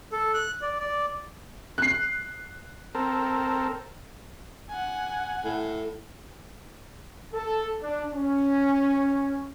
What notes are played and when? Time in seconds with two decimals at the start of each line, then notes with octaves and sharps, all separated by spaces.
0.12 A4
0.34 F#6
0.62 D5
0.80 D5
1.78 F#6 C7
2.95 C4 A4 A#4
4.70 F#5 G#5
5.45 A2
7.34 A4
7.82 D4
8.13 C#4